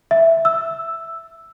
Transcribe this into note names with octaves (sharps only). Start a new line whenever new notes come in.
E5
E6